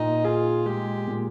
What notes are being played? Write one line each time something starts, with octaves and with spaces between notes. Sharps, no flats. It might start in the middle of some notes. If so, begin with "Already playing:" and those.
Already playing: A#2 D#4
F4 G#4
G#3 G4
A#2